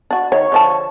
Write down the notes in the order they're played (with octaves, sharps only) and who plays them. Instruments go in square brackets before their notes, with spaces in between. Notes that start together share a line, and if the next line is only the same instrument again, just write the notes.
[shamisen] D4 F#4
[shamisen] D#3 [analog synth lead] C#5
[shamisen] D3 F3 A5